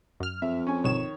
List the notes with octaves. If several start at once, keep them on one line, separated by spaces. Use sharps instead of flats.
F#2 F6
F2 E5
C#4 G#5
G1 B2 D#3 C#5 E7